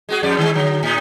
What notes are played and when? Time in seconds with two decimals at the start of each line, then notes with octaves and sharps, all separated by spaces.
0.09 G#3 F#4 G#4
0.23 F2 G#2 D5
0.38 D#3 G#3
0.54 D3 F#3
0.83 A2 D#4